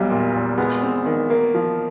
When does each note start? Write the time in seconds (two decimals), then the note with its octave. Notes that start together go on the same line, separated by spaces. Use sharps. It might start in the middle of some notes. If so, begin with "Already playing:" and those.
Already playing: B1 E2 F#3 G3
0.10 A#2
0.34 A#2
0.58 G#3 B3
0.82 C4
1.06 D#3
1.30 A#3
1.54 F3